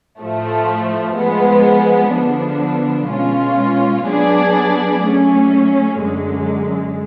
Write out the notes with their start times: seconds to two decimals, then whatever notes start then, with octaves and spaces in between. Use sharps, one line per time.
0.20 A2 F3 A3
1.17 F3 G#3 B3
2.13 D3 F3 B3 D4
3.10 B2 G#3 C#4 F4
4.07 F#3 B3 D4 G#4 D5
5.04 F#3 A3 C#4
6.01 F#2 D3 G#3